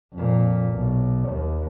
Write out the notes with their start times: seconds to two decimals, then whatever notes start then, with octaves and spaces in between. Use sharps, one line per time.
0.14 F2 A#2
0.72 B1
1.29 D#2